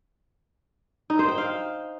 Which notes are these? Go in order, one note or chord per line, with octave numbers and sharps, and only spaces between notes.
D#4
C5
G5
F5